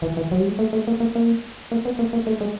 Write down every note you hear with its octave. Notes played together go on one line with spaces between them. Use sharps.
E3
E3
F#3
G3
G#3
A3
A3
A#3
A#3
A#3
A#3
B3
A#3
A#3
A3
G#3